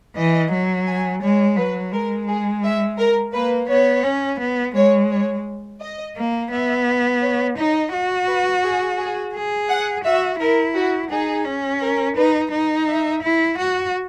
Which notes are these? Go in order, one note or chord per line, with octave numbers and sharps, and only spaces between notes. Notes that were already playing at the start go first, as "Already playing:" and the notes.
E3 D#5
F#3
G#5
G#3 C#5
F#3 B4
G#3 A#4
G#4
E5
A#4
A#3 B4
B3 C#5
C#4
B3
G#3 C#5
C#5
D#5
A#3
B3 E5
C#5
D#4 D#5
F#4
B4
G#4
G#4
G#4
F#5
F#4 E5
E4 A#4
F#4
D#4 G#4
C#4
A#4
D#4 B4
D#4
E5
E4
F#4 F#5